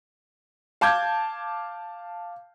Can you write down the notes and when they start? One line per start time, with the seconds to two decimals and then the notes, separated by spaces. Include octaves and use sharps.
0.81 F5 A5 D6 G6 G#6